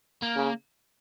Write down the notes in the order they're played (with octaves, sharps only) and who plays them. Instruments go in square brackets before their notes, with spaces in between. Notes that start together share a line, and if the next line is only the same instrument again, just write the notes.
[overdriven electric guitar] A#3
[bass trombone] C#3